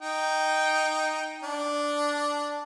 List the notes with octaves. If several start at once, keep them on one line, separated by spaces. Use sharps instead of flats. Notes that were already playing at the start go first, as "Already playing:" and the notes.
D#4 G5
D4